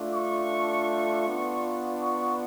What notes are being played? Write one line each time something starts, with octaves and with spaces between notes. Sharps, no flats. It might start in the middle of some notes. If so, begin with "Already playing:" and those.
Already playing: A3 D4 F4
C#6
B3 D4 F4
C#6